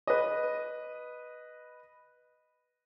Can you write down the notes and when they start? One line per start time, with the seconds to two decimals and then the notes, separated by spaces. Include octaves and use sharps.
0.07 B4 D#5